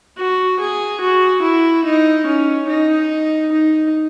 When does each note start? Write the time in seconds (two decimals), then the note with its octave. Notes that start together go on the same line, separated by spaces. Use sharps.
0.17 F#4
0.59 G#4
1.00 F#4
1.42 E4
1.85 D#4
2.26 C#4
2.68 D#4
3.52 D#4